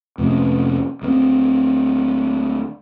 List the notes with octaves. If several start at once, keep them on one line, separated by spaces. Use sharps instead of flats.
F2 C3 A3 C#4
D2 B3 C4